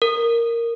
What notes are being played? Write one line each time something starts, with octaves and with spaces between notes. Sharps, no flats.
A#4